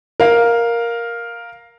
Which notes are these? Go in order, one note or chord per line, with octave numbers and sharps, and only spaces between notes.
A#4 F5